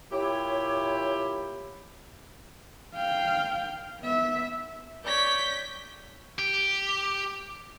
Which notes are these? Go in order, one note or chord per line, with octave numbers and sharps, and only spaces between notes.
A#2 E4 G4 C#5
F5 G5
B3 E5
C#5 D5 G6 B6
G4